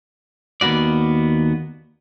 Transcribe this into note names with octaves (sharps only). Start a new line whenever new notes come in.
D#2 A#3 B3 F#4 D5